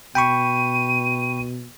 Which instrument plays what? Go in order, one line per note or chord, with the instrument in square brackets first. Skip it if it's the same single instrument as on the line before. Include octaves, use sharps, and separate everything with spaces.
[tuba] B2 [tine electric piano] G5 B5 C#6 [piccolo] D#7